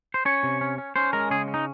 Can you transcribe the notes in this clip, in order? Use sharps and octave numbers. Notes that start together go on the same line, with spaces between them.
C5
C#4 C#5
C3
C#4
C#4
C#4 C5
G#3 A#4
C#3 G#4
C#4
D#4